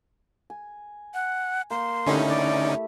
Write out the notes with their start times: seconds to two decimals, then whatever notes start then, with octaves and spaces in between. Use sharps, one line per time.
0.50 G#5
1.14 F#5
1.71 A#3 C6
2.07 D3 A3 C#4 D#4 E4 G4
2.28 D5